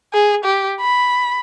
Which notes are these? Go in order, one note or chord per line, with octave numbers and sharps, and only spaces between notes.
G#4
G4
B5